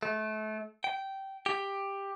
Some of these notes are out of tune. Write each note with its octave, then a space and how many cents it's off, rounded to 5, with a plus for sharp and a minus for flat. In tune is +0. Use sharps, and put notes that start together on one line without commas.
A3 -30
G5 -15
G4 +10